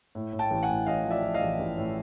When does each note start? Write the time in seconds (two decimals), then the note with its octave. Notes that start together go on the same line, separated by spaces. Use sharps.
0.15 A2
0.33 A2
0.39 G5 A5
0.51 A1
0.63 F#5 G#5
0.69 A2
0.86 A1 D#5 F5
1.05 F3
1.11 D5 E5
1.23 F3
1.34 D#5 F5
1.41 A1
1.59 A1
1.77 A2